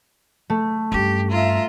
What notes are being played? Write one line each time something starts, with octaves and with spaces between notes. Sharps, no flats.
A3
G2 C#4 G4
F4 E5 A#5